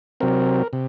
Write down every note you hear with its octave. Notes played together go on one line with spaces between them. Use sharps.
C3 F#3 C4 A#4
C3